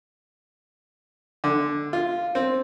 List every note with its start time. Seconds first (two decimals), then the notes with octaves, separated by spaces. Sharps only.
1.44 D3
1.93 F4
2.35 C4